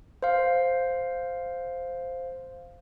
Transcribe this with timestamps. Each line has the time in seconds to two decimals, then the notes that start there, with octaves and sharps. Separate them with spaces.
0.22 C5 F5